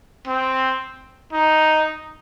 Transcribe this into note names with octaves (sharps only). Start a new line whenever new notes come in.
C4
D#4